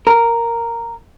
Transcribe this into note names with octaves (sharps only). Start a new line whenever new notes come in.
A#4